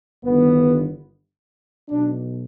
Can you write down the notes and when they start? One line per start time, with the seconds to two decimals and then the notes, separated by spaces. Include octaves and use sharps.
0.24 G1 G2 D#3 B3
1.89 B1 B2 D4